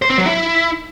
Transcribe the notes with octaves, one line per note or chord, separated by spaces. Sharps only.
C5
C4
F#3
E4